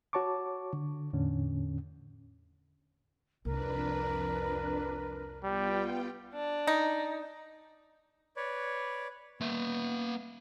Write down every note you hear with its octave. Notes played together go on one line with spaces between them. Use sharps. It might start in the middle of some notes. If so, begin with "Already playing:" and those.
F#4 C#5 A5 C#6 D6
D3
E2 A2 D3 C#4
C2 F2 D4 A#4 B4
G3 B3 F4 G5
D4
D#4
B4 C#5 D5
A#3 B3 E5